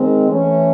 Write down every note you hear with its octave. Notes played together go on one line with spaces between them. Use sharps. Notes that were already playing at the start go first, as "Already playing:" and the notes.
Already playing: D#3 G#3 C4
E3 A3 C#4